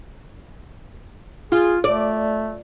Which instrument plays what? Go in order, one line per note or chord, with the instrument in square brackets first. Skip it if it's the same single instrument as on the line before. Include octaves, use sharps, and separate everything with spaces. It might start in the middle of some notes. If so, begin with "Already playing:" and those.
[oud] F4 [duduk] G#4
[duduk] A3 [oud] D5